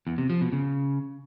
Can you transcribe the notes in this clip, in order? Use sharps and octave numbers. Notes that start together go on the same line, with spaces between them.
E2
C3
F3
B2
C#3